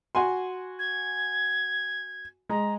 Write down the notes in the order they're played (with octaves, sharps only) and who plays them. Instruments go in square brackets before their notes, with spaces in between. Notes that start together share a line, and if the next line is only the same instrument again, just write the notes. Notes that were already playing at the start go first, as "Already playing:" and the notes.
[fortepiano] F#4 G#5 C6
[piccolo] G#6
[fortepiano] G#3 [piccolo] A#5